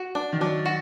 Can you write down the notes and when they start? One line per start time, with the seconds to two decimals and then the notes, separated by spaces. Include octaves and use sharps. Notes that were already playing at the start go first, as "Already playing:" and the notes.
Already playing: F#4
0.15 D4
0.32 D#3
0.40 F#3 D4
0.66 F#4